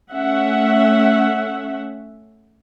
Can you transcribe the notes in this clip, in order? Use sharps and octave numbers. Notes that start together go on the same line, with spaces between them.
A3 C#4 E5 F#5